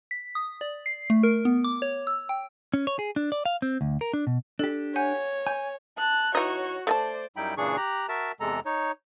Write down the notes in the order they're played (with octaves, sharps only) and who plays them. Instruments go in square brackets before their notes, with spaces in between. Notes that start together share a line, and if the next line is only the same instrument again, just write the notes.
[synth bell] B6
D#6
D5
C7
A3
A#4
B3
D6
C#5
E6
G5
[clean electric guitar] C#4
C#5
G#4
D4
D5
F5
C4
D2
A#4
D4
B2
[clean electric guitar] D4 G4 [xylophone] A4
[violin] C#5 [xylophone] F#5 G#5 G6
[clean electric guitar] G#5 [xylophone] G6
[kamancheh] A5 F#6
[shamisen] E3 D#4 [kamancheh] F#4 C#5
[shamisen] A3 G#5 A5 [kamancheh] C5 D5
[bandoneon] F#2 G3 D#4 E4 G5 B5
A#2 C#3 E3 D4 G#4 C#6
G4 A#5 F#6
F#4 A#4 E5 A5
E2 C3 G#3 A4 A#5
D#4 C#5